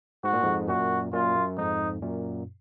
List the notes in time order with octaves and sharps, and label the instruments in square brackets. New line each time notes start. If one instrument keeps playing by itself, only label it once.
[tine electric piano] G#2 [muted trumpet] F#4
[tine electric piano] A#2
F2 G#2
[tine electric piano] F#2 A#2 [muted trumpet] F#4
[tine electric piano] F#2 A#2 [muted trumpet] F4
[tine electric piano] F#2
[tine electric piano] F2 G#2 [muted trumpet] D#4
[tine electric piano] F#2 A#2